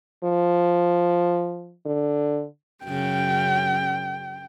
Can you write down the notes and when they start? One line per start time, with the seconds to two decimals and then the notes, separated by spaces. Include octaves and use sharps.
0.24 F3
1.85 D3
2.85 F#2 C#3 G5